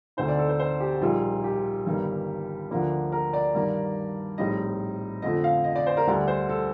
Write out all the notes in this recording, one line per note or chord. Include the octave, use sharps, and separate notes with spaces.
D2 D3 A3 C4 D#4 C5
D5
A4
C5
C5
G4
A#1 A#2 G3 A#3 D#4 F4
G4
G1 G2 D#3 G3 A#3
D2 D3 F3 A#3 D4
A#4
D5
G2 D#3 A#3
A#1 A2 G3 C4 D#4 D#5
F2 D3 F3 A3 D#5
F5
D#5
D5
C5
A#4
D2 D3 G3 D4 D5
C5
A4